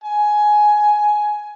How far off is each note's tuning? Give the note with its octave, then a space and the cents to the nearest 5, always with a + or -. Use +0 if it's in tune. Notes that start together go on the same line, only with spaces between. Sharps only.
G#5 +15